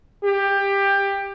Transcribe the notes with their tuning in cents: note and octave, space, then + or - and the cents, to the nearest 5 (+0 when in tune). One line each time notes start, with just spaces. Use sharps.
G4 +15